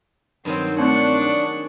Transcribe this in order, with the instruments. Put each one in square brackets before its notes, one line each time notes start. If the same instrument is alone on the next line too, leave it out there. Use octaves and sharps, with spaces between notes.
[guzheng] G2 D#3 F#3 [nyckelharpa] C4
[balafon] A3 C4 A#4 [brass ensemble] D4 [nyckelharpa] F#5 C#6
[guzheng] G#4